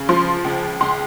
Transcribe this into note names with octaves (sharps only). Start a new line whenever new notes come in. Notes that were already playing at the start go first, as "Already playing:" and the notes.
Already playing: C#3
F3 C6
C#2
C#2 C6